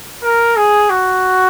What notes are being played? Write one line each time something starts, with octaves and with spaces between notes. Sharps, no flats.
A#4
G#4
F#4